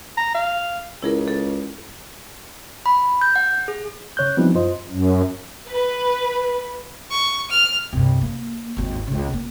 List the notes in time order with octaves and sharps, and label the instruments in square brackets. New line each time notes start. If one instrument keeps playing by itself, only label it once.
[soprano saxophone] A#5
F5
[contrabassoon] C#2 [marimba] E4 G#4 A#4
[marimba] A4
[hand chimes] B5
G6
F#5
G#4
[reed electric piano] C#3 C#5 F#6 G6
F3 G3 B3 C4 D#4 E4
F#2 F4 C5 D#5
[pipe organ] F#2
[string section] B4
[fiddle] C#6
F6
[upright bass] C2 G2
A#3
G#1 D#2
C#2 C#3
A#3